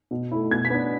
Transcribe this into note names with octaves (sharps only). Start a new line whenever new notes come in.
B2
A3 E4
B2 G#6
B6
B3 D4